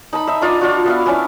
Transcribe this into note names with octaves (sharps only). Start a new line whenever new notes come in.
D#4 A5 B5
D#4 E5
D4 F4 D5 D#5
D4 F4 F#4
B3 E5 F5
B3 C#4 D4 E4